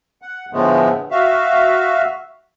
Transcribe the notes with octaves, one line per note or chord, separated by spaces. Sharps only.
F#5
A2 D3 F3 G#3 A3 B3
F#4 E5 F5